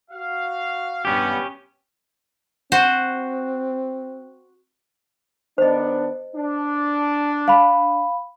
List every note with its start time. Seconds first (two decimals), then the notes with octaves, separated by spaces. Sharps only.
0.11 F#4 F5
1.05 G2 B3 C#4 G4
2.72 C4 F#4 C5
5.58 D#3 B3 D4 C5 D#5
6.35 D4
7.48 F5 B5